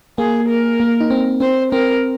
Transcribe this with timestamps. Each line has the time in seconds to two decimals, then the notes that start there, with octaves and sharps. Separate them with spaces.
0.18 A#3 G#4
0.48 A#4
0.80 A#3
1.01 D#4
1.10 C4
1.40 C4 C5
1.72 C4 A#4